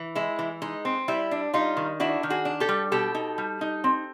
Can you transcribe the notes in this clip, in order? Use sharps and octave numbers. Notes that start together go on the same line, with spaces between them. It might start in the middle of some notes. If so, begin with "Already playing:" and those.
Already playing: E3
G#3 E4
E3
G#3 D#4
C4
G3 E4
D4
G3 D#4 F4
D#3
D4 E4 F#4
D#3
F#4 G#4
D4
G4 A4
G3
B2 G4 A4
D#4
G3
D#4
C4